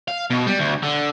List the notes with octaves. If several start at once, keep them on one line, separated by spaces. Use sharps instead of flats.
F5
B2
G3
D2
D3